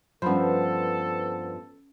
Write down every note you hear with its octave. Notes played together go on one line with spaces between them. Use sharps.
G2 F3 B3 C#4 A4 C5 B5